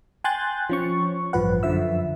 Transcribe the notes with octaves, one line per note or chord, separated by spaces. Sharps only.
G5 G#5 C6 F#6 G6 A6
F3 C#4 C#6
A1 G2 F3 B4 F#5
F#2 D3 F3 E5 E6